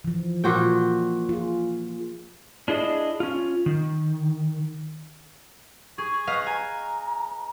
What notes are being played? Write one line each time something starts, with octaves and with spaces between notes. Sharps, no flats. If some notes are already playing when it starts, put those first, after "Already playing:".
E3 F3
A#2 F#4 G5
F4 G#4
D4 E4 G#4 D#5
C#4 F4
D#3
G#4 C#6
B4 D#5 F5
G#5 A#5